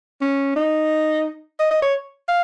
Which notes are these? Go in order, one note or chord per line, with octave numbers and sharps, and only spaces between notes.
C#4
D#4
D#5
D#5
C#5
F5